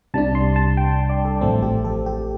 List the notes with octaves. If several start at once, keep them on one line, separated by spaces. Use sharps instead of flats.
C2 C3 G3 D4 A5
C6
A5
G5
D5
A4
A1 A2 F3 A3 C4 A4
G4
A4
G4